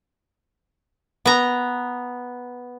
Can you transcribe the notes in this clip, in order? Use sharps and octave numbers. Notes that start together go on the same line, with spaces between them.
B3 A#5